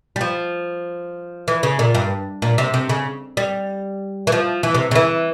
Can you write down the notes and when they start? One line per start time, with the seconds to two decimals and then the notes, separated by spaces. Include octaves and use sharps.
0.16 G3
0.21 F3
1.48 E3
1.63 C#3
1.79 A#2
1.95 G2
2.42 A#2
2.58 C3
2.74 C3
2.89 C#3
3.37 G3
4.27 E3
4.32 F3
4.63 E3
4.74 C3
4.91 C#3
4.95 E3